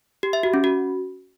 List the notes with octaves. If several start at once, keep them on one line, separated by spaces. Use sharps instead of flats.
G4
E5
F#4
C#4
F#4